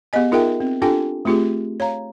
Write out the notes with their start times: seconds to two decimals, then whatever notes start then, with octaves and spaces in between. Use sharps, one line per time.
0.13 B3 G4 G#4 D#5 G#5
0.32 D#4 F4 G#4 A#4 E5 G5
0.60 C4
0.82 D4 F4 G4 A4 G5 G#5
1.25 A3 C4 F4 G4 G#4
1.80 C#5 F5 A#5